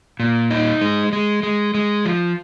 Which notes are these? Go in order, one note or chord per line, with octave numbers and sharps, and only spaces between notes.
A#2
D#4
G#3
G#3
G#3
G#3
F3